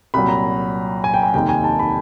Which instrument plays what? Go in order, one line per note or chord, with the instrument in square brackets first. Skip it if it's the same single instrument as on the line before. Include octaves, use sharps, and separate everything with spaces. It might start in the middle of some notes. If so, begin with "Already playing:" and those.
[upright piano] C2 A#2 F#3 B5
A#5
G#5
G5
G#5
F1 D#2 D#3 G5
G#5
A5
B5